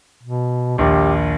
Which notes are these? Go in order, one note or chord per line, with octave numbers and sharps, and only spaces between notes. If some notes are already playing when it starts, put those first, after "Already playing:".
B2
A#1 D#2 G4